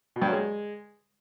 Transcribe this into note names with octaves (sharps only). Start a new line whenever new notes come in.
B2
G2
F#3
G#3